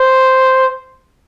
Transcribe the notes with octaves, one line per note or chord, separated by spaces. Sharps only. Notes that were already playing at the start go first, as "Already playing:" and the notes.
Already playing: C5